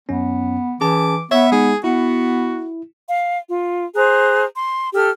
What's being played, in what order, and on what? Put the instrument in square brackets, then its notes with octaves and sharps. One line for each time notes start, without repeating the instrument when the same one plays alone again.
[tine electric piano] F#2 C#4 [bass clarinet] B3
[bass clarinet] E3 [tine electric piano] C#4 G#4 A5 [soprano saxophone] D6
[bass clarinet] B3 [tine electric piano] C#5 E6 [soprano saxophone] E5
[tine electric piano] G#3 D#4 [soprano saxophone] G#4
[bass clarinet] B3 [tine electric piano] E4 [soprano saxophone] F#4
[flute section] F5
F4
G#4 C5 A#5 F#6
C6
G4 A4 E6 F6